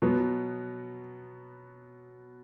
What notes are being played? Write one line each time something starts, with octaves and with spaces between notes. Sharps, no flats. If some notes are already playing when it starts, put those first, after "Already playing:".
B2 F#3 B3